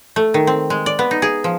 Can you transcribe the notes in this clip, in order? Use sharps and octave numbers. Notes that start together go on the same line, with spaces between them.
A3
D#3
C4
G#3
D5
B3
D#4
G#4
F3